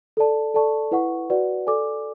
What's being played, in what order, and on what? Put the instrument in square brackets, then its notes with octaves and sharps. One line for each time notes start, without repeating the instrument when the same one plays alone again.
[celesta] A4 D5 A5
A4 D5 A5 C#6
E4 B4 F#5 C#6
F#4 B4 D5 F#5
A4 D5 G#5 D6